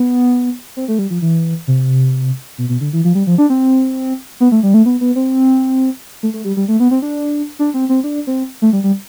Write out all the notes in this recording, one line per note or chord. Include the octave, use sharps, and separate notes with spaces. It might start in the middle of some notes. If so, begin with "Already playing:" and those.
Already playing: B3
C4
A3
G3
F3
E3
C3
B2
B2
D3
E3
F3
G3
F3
D4
C4
B3
A3
G3
A3
B3
B3
C4
A3
A3
G3
G3
A3
B3
C4
D4
D4
C4
C4
D4
C4
A3
G3
G3